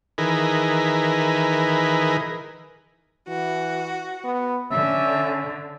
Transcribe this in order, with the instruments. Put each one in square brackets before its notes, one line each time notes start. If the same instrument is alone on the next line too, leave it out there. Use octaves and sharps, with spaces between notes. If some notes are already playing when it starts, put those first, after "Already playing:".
[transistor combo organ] D#3 E3 G#4 A#4 B4
[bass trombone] E3 [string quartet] F#4
[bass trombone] B3
[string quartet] D3 [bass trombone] C#4 [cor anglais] E5